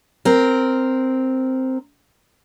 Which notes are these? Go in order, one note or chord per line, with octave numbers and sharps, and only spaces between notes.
C4 A#4